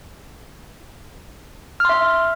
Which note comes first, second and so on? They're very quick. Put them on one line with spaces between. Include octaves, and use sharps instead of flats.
F6 C6 E5